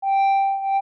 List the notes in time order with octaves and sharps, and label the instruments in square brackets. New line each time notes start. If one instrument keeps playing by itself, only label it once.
[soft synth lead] G5